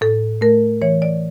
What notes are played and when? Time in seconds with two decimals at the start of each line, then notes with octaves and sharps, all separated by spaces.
0.01 A2 A4
0.41 A3 A#4
0.82 E3 C#5
1.02 D5